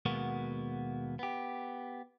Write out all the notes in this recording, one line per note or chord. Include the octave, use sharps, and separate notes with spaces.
D#2 B2 G#3 A#3 B3 F#4
B3 G4